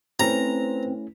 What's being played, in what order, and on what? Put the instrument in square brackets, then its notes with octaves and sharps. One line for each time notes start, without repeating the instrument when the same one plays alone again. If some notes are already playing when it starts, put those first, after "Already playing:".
[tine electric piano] A3 C#4 E4 [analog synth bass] C4 [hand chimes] B4 C5 [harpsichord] A#5